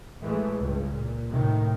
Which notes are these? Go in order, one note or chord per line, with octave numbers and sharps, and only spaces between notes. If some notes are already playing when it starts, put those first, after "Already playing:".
A1 E3 G#3 A3
C#2 G2
A#2
A2 C3 D#3